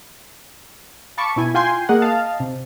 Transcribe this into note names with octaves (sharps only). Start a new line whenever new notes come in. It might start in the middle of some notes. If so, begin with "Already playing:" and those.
F5 A5 B5 C#6 D6
B2 E4 G#5
F4 G5 G#5 C6
A#3 G#4 D#5 F#5
D#5 F5 A5
C3